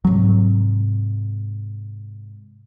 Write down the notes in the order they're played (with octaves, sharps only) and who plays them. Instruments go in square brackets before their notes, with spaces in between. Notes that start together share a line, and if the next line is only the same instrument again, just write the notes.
[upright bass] G#2 C3 [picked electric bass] F#3